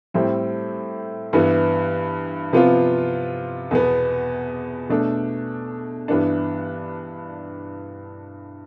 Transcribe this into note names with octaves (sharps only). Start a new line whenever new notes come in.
A2 G3 C4 E4 A4
G2 E3 B3
C3 F3 B3 F4
E2 B2 B3
B2 A3 D4 A4
G2 E3 B3 D4